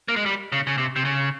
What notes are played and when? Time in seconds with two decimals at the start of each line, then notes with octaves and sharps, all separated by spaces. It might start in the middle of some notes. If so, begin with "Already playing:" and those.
0.08 A#3
0.16 G#3
0.26 G3
0.52 C#3
0.67 C#3
0.78 C3
0.96 C3
1.05 C#3